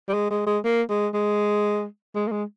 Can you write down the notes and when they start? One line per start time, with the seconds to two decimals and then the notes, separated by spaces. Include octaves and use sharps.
0.08 G3
0.14 G#3
0.30 G#3
0.47 G#3
0.64 A#3
0.90 G#3
1.14 G#3
2.15 G#3
2.27 A#3
2.32 G#3